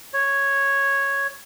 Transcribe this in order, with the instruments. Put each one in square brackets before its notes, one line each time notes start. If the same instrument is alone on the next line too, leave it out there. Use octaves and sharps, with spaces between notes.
[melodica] C#5